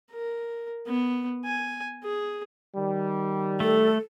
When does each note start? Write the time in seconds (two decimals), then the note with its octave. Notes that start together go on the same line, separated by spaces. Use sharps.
0.11 A#4
0.87 B3
1.45 G#5
2.03 G#4
2.75 D#3 G3
3.60 A3 A4